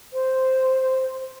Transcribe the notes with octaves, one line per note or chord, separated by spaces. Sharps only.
C5